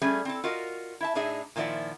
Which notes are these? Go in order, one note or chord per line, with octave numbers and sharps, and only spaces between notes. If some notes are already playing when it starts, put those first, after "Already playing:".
G3 A3 C#4 G#4
C4 E4 A4
F4 F#4 A#4 D#5
E4 E5 A5
A2 D4 D#4 G#4 E5
A#2 D#3 F3 E4 D5 F#5